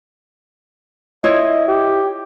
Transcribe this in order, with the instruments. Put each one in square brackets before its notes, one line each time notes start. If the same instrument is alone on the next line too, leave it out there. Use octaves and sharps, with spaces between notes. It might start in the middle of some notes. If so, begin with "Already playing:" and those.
[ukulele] E4 F4 C#5 [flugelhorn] D#5
[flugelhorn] G4